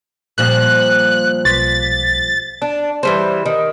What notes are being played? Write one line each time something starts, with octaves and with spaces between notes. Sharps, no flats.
A#2 F3 G3 F#6
B1 A6 B6
D4
E3 G3 C5
D#3